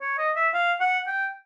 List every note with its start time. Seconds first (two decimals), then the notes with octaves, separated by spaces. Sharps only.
0.01 C#5
0.18 D#5
0.36 E5
0.54 F5
0.80 F#5
1.07 G5